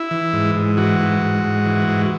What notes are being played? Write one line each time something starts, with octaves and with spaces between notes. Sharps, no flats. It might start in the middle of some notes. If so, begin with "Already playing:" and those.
Already playing: E4
E3
G#2
G#2
E3 F#4
G#2
G#2
G#2
E3
G#2